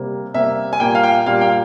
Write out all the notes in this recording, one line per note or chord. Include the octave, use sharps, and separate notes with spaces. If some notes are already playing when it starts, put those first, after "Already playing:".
Already playing: C3 G3 A#3
C3 G3 A#3 E5
G#5
A#2 G3 A#3 G5
F5
G5
A#2 G3 A#3 F5
G5
F5